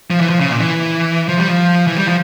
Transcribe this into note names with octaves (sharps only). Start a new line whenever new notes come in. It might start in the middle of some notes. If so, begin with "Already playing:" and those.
F3
E3
F3
C#3
A#2
E3
F3
G3
F3
E3
G3
F3